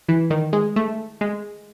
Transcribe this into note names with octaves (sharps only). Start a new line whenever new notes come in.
E3
D#3
G#3
A3
G#3